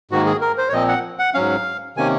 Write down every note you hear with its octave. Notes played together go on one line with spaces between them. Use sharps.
G#2 D#3 A#3 F#4
G#4
A#4
C5
C#5
A#2 F3 C4 D#5
F#5
F#5
G#2 F#3 C#4 F5
C3 D#3 A#3 C#4 G#5